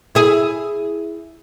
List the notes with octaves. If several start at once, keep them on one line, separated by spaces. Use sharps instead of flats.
E4 G#4